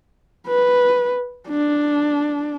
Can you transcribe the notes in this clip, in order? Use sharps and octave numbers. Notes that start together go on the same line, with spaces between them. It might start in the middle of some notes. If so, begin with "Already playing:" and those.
B4
D4